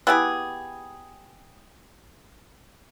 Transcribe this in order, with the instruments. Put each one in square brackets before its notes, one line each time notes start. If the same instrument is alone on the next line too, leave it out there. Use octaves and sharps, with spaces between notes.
[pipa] B3 E4 G4 G#4